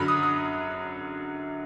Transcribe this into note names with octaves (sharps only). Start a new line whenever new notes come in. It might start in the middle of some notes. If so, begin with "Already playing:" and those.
Already playing: F#2 D3 F#3 B5
D#6
D#6